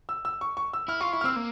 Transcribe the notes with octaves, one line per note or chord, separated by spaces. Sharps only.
E6
E6
C#6
C#6
E6
E4 F6
F4 C#6
E4 C#6
F6
C4 E6
A#3